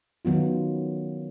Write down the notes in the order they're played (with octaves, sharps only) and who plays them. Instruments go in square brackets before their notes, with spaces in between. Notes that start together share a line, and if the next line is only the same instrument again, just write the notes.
[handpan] D#3 F#3 B3 F4